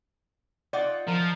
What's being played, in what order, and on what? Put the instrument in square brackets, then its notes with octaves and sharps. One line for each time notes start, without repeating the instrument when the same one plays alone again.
[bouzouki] D#4 F4 F#5 [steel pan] D5
[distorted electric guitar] F3 [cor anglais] A#4